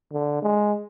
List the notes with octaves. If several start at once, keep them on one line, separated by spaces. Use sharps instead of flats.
D3
G#3